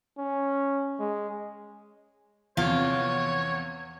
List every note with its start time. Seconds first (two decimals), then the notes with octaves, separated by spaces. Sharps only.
0.17 C#4
0.99 G#3
2.57 E2 C3 F3 F4 C#5